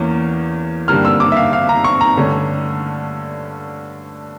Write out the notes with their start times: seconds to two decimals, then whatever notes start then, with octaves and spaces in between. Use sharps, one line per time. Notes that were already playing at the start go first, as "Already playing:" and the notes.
Already playing: E2 E3 A#3 C#4
0.88 G2 D3 G3 A#3 F6
1.05 E6
1.20 D6
1.32 E5
1.37 F5
1.53 F5
1.69 A#5
1.84 C#6
2.01 A#5
2.17 G2 D3 A3 C#4